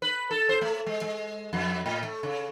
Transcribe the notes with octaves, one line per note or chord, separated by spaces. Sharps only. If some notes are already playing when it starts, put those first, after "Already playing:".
B4
A4
C5
A3
G#3
G#3
F2
A2
A3
C#3